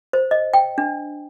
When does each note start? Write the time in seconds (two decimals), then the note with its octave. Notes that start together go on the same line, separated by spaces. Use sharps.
0.13 C5
0.31 D#5
0.54 G5
0.78 D4